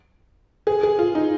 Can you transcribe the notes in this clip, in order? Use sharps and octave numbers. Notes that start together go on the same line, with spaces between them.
G#4
G#4
F4
D#4